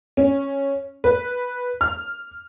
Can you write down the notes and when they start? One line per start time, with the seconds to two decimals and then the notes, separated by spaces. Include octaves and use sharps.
0.17 C#4
1.04 B4
1.81 F6